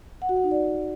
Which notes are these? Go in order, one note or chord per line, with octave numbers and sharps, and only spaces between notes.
F#5
F#4
F#5
D#4
D5